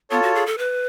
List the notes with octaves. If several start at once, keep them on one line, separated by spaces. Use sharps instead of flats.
B3 F4 A4 C#5
F#4
G#4
A4
B4